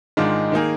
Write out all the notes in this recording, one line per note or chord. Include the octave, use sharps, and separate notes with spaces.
G#2 D#3 G#3 D4 F4
D#3 A#3 D#4 G#4